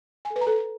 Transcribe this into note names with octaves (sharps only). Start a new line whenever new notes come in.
G#5
A4
B4
A#5
A4